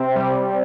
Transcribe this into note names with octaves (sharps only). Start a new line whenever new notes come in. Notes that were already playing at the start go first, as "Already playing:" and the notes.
Already playing: C3 C4
G3